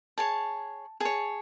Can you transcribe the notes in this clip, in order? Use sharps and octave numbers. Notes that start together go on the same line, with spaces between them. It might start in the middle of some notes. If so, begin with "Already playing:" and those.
G#4 C#5 A5
G#4 C#5 A5